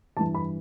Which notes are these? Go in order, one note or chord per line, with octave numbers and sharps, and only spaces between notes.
G2 E3 A5
B5